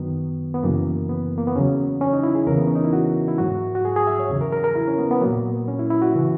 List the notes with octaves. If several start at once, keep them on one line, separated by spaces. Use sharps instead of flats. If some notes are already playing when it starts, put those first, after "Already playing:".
Already playing: F#2 D#3 F#3 B3
B3
F#2 C#3 E3 A#3
B3
A#3
B3
E2 C#3 F#3 C#4
C#4
D#4
E4
G#4
E2 C#3 E3 A#4
B3
C#4
D#4
E4
F#4
E4
G#2 F#3 F#4
F#4
G#4
G#4
E5
C#5
E2 C#3 F#3
A#4
A#4
A#4
E4
C#4
B3
B3
A#2 F#3 A#3
C#4
E4
E4
F#4
C#3 E3